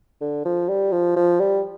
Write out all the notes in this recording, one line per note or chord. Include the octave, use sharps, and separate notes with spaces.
D3
F3
G3
F3
F3
G3